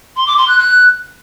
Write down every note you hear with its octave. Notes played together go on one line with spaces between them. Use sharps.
C6
D6
C6
F#6
F#6